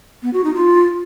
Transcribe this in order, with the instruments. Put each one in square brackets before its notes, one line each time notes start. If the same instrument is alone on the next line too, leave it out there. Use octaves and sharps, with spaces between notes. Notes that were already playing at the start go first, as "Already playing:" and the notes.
[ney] B3
F#4
D#4
F4